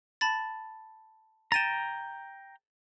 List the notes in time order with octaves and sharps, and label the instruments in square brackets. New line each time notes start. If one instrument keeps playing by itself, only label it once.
[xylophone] A5 B5 A6
[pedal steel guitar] G5 A#5 [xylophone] A6 D#7 E7